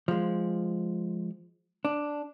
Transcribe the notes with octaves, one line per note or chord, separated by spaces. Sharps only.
F3 G#3
D4